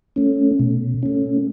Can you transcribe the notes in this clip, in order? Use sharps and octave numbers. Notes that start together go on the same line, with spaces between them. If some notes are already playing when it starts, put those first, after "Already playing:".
A3 C#4
B2
A3 C#4